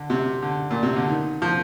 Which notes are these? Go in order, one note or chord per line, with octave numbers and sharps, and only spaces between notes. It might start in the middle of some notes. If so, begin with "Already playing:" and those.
Already playing: D3
C3
D3
A#2
C3
D3
D#3
F3